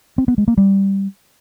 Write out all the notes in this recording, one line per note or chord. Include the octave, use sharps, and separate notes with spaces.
C4
B3
G#3
A#3
G3